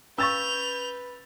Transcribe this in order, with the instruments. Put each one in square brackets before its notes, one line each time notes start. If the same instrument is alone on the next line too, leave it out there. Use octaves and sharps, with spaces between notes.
[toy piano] C#4 F5 C#6 [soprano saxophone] B4 [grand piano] E6 A6 [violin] G6 F7